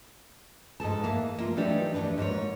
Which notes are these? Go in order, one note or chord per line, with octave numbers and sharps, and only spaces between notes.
G#2 G#4 A4 A5
E3 A#3
A#3 F4
E3 F#3 A3 D4 D#4 G4
E2 F#3 D4 A4 B4
G#2 A#3 C5 C#5